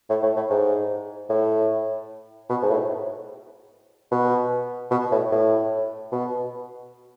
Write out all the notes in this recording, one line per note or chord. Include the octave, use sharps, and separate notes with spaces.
A2
A2
A2
G#2
A2
B2
G#2
A2
B2
B2
A2
A2
B2